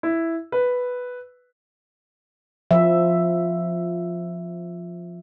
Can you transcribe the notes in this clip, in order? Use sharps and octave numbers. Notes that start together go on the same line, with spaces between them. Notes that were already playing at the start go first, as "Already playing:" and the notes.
E4
B4
F3 E5